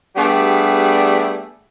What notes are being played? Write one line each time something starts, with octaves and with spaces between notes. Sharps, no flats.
G3 A3 B3 D4 G4 G#4